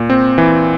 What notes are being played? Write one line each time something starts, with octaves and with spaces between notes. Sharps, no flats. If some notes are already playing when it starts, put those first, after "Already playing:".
Already playing: A#2
C4
E3